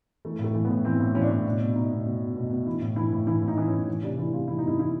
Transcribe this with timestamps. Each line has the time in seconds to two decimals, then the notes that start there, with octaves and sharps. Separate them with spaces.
0.25 E3 A3
0.39 A2
0.44 A3
0.54 E3
0.65 B3
0.70 A2
0.85 E3 C4
1.00 A2
1.14 E3 C#4
1.22 D4
1.29 A2 C#4
1.46 B2 D4
1.61 B2
1.75 B2 D#4
1.91 B2
2.06 B2
2.22 B2
2.36 B2
2.51 B2
2.66 E3 E4
2.82 A2
2.96 E3 E4
3.12 A2
3.27 E3 E4
3.42 A2
3.48 D#4
3.57 E3
3.68 C#4
3.73 A2
3.88 E3
4.02 C3 D4
4.18 E3 E4
4.33 C3 F4
4.48 E3 E4
4.58 D#4
4.63 C3 E4
4.79 E3 E4